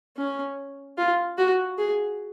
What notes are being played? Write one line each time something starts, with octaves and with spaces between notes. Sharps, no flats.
C#4
F4
F#4
G#4